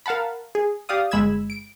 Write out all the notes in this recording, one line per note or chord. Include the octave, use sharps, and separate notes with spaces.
A#4 F5 F#5 A5 B5
G#4
G4 D5 F5 D#6
G1 G#3 B5 E6 G#6 E7
D7